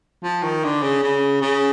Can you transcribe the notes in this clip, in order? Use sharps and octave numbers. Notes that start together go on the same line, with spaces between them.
F3
D#3
D3
C#3
C#3
C#3